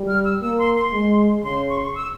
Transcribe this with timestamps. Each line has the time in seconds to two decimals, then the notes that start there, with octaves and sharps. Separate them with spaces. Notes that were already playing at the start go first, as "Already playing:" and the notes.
Already playing: G3
0.08 F6
0.25 E6
0.41 A#3 E6
0.58 C6
0.76 C6
0.92 G#3
1.44 C#3 C6
1.69 C#6
1.77 C6
1.84 C#6
1.95 E6